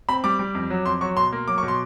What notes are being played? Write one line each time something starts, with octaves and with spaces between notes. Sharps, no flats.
C4 B5
G3 D6
G3
F2
F#3
F2 C6
F#3 C#6
B2 C6
A#3
F#3 D6
C#6
B2
C6